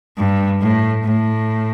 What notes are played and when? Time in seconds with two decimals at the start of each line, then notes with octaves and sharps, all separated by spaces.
0.17 G2
0.60 A2
1.04 A2